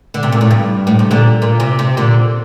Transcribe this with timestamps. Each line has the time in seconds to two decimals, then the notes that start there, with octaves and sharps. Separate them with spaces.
0.14 D3
0.23 C3
0.32 A#2
0.41 A2
0.51 G2
0.87 A2
0.99 C3
1.11 A#2 D3
1.42 A#2
1.60 C3
1.79 C3
1.97 A#2 D3